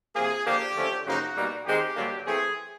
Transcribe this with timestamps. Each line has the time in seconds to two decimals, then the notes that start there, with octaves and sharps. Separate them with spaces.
0.16 C3 F3 A#3 G#4
0.46 D3 F3 A#3 D4 G4
0.76 D3 F3 A3 C#4
1.06 F#2 C#3 F3 A#3 D#4 F#4
1.36 B2 G3 A#3 D#4
1.66 D#3 G#3 C4 D#4 G4
1.97 G2 D3 F#3 A#3 D4
2.27 E3 A3 C4 G#4